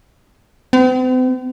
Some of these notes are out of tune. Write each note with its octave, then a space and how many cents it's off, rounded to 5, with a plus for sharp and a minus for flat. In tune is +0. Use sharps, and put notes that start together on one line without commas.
C4 -45